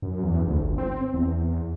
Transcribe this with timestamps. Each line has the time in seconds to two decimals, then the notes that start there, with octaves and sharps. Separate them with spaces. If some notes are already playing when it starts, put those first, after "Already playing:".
0.02 F#2
0.23 E2
0.47 D2
0.61 G1
0.78 C4
1.14 E2